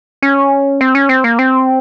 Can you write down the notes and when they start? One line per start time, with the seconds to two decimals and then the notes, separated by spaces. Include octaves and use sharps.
0.22 C#4
0.81 C4
0.95 C#4
1.09 C4
1.24 A#3
1.39 C4